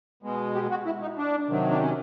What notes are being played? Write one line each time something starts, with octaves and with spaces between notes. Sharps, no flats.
B2 G#3
G4
F#4
E4
D#4
D4
C3 D#3 F#3
D4
C#4